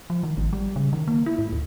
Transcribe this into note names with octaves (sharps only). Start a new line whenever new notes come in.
F3
D#3
G#1
G3
C#3
D#3
A#3
E4
G#2
D2